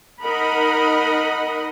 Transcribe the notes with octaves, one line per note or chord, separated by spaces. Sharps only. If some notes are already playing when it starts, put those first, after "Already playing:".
D#4 A#4 D#5 F#5 B5